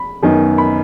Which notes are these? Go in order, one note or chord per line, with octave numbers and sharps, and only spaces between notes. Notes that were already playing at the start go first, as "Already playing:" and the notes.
Already playing: B5
F#2 D#3 B3 D#4
B5